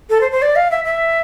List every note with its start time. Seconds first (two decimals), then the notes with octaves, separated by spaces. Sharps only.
0.10 A4
0.21 C5
0.32 C5
0.42 D5
0.56 F5
0.71 E5
0.85 E5